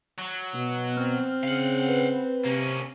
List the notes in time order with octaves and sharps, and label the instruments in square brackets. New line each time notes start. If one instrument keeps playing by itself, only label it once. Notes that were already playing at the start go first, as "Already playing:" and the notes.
[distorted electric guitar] F#3
[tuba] B2 [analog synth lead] B3
[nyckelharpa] C4 [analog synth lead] F6
[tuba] C#3 [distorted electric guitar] F5 F#5
[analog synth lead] B4
[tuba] C3 [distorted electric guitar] A#3 C#4